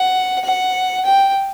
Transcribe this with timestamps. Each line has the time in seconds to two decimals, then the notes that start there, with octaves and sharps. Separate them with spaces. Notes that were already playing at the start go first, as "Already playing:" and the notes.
Already playing: F#5
0.44 F#5
1.05 G5